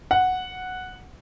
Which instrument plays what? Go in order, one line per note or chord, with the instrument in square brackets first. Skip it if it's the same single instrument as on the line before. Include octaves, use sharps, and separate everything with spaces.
[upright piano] F#5